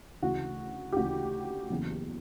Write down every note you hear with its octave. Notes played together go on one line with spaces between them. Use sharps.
D2 C#3 E3 F#4
G4
D2 C#3 E3 F#4
F#1 E2 C#3 E3